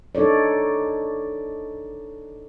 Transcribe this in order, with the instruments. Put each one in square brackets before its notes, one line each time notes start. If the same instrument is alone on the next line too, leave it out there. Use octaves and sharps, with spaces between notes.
[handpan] D4 D#4 A4 C#5 D5